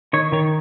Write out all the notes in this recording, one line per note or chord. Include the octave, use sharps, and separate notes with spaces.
D#3 C#5
D#3 C#5